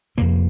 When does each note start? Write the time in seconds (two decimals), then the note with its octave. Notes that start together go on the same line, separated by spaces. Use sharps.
0.17 F2 C3 A#3